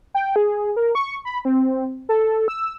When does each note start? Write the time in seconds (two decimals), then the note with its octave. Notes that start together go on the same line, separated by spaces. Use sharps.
0.14 G5
0.36 G#4
0.76 A#4
0.95 C#6
1.25 B5
1.45 C4
2.09 A4
2.48 E6